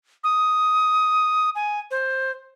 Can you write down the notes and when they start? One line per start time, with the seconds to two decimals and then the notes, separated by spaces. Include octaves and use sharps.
0.24 D#6
1.55 G#5
1.91 C5